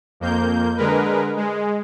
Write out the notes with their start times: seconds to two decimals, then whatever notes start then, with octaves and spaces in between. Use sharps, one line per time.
0.20 F2 A#3 G6
0.77 D3 G#3 A#4 B4
1.37 G#3